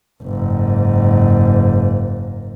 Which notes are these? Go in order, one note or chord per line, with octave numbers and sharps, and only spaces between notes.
F#1 G#2